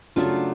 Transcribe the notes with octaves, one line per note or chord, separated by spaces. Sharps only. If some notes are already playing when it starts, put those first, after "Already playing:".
C#3 F#3 A3 D4 F4